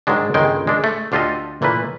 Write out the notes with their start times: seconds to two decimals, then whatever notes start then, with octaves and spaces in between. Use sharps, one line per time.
0.07 G#2 D#3 F#3 G#3 D4
0.34 G1 C#2 D#3 G#3 G5
0.67 G#3 D4
0.84 A3
1.12 D2 D4 F4 G4 A4 D#5
1.62 A#2 E3 A3 A#3 B4